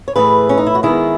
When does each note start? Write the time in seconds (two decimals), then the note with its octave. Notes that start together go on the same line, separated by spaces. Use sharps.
0.08 C#5
0.16 A2 E3 A3 G#4 B4
0.49 C#4
0.58 D#4
0.67 E4
0.75 F#4
0.83 D#3 G#3 B3 E4 G#4